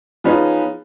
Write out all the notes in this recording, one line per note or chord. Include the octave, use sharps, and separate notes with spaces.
F3 B3 C#4 D#4 G#4